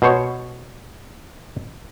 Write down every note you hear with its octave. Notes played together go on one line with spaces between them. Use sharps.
B2 C5 C#5